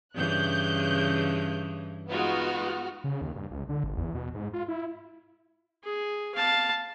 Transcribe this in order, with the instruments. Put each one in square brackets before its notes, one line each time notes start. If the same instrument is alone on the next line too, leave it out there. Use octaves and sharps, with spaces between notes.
[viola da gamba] G2 C#3 E3 [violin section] F#6 G6
[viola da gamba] G#3 D#4 F4 [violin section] B3 F#4 F6
[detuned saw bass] C#3
D#2
G2
C#2
D3
G#1
E2
B2
G#2
F4
E4
[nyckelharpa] G#4
F5 A5